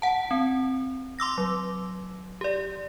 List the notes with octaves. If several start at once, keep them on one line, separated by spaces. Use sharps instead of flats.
F#5 A5
C4
C6 D6 E6 A#6
F#3
G4 D5